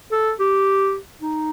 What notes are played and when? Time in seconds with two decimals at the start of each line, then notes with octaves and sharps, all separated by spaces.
0.12 A4
0.40 G4
1.22 D#4